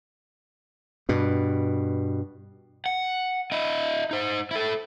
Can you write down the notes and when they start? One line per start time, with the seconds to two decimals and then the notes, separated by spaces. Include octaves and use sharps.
1.09 G2 B2
2.86 F#5
3.52 E4 D#5
4.11 D#4 C5
4.51 E4 A4